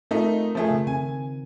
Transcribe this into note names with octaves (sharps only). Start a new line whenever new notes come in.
A3 C4 D#4 F4 A#4
F3 A3 G#4
C#3
D#3 C4 G#5